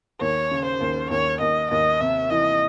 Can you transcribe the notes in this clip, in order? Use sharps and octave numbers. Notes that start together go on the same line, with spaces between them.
D#2 C#5
C#3
C5
D#2
D#2 C#5
D#2 D#5
D#2 D#5
C3 E5
E3 D#5